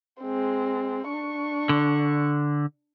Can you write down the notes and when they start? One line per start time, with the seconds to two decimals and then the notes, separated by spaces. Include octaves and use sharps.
0.21 G#3 C4
1.08 D4 C#6
1.69 D3